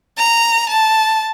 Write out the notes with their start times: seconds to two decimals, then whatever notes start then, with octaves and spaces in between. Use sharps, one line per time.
0.18 A#5
0.69 A5